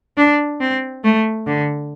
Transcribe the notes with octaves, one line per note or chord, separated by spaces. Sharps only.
D4
C4
A3
D3